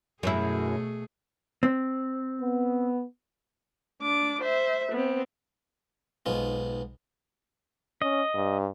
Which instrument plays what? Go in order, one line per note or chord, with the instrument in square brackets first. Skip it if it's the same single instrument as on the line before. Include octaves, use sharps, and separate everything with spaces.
[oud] F#2 F#3 E4 [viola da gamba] B2 A3 G#4
[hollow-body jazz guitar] C4
[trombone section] B3
[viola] D4 D6
C5 E5
B3 C4
[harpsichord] B1 G#2 B3 F4
[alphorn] C#4 [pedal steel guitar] D#5
[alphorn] G2